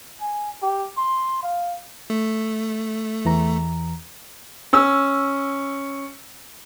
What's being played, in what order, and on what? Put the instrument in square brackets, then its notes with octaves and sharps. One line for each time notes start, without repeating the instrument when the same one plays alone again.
[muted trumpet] G#5
G4
C6
F5
[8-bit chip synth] A3
[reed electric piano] E2 E3 A#5
[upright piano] C#4 E6